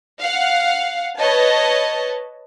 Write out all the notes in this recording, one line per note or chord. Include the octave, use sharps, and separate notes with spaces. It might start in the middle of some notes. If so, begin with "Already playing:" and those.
F5 F#5
B4 C#5 D#5 A5